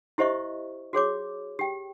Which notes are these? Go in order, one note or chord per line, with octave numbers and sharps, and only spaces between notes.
E4 G4 C5 D#5 E5 C#6
F#4 G#4 C#5 D6
G4 G5